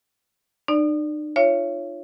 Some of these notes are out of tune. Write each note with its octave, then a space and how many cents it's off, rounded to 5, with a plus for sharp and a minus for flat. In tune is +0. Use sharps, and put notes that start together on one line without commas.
D#4 -45 D5 +0
F4 +0 C#5 +0 E5 +45